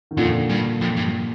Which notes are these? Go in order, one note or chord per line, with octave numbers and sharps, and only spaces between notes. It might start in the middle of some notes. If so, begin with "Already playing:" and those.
D#3
F2 A#2 D3
G2
F2
G2